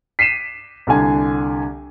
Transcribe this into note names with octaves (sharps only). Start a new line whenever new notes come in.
B6 C7 D#7 E7
C2 D3 G#5